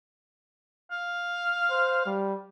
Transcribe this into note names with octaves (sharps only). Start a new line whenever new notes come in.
F5
C5
G3